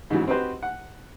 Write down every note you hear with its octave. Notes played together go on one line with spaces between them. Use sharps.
G#2 C#3 E3 F#3
C4 D#4 F#4 G4 B4 C5
F#5